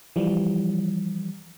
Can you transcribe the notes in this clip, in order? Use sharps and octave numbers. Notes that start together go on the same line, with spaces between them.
E3 F3 G3